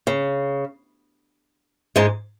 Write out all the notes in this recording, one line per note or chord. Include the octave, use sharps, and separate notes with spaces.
C#3
G#2 G#3